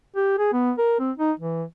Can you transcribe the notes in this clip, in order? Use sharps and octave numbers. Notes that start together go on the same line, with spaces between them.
G4
G#4
B3
A#4
C4
D#4
E3